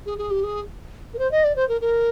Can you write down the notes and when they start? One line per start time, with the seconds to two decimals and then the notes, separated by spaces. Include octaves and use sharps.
0.06 G#4
0.18 G#4
0.30 G4
0.43 G#4
1.14 A#4
1.19 C5
1.31 D#5
1.44 D5
1.56 C5
1.68 A#4
1.81 A#4